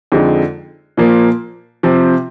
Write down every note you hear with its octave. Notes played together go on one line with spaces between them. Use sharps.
F2 D3 G#3 D#4
A#2 F3 A#3
C3 F3 C4